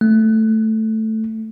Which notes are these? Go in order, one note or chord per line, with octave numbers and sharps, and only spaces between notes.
A3